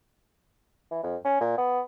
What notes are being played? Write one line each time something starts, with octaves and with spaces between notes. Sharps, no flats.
E3
F2
C#4
A#2
B3